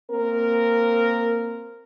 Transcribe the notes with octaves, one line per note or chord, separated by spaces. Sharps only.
A#3 C4 A#4